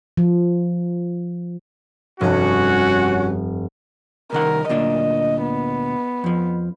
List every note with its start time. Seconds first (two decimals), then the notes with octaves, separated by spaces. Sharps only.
0.17 F3
2.21 F1 G2 C#4 F#4
4.33 C2 D#3 A#4 F#5
4.69 D2 A#2 D4 D#5
5.42 B3
6.24 F2 F3